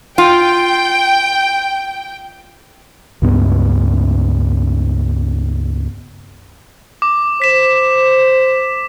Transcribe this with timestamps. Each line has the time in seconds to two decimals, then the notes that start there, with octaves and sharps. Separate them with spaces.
0.18 F4 G5
3.22 C#2 G2 B3
7.02 D6
7.42 C5 B6 E7